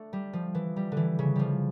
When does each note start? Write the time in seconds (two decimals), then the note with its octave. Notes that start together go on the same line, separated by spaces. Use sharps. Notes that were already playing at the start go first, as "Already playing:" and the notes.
Already playing: A3 D4
0.13 G3
0.33 F3
0.55 E3
0.76 G3
0.92 D3
0.97 E3
1.19 C#3
1.35 F3 G3